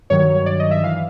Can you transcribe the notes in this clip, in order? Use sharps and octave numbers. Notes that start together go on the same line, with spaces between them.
G2 D#3 F#3 C#5
D5
D#5
E5
E3 F5